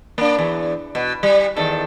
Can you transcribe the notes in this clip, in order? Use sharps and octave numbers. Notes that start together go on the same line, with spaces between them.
A#3 D4
E2
B2
G3
E2 D#3 A4